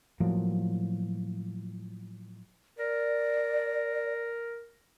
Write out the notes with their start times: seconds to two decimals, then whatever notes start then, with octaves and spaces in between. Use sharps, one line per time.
0.20 A2 F3 F#3 A#3
2.79 A#4 D5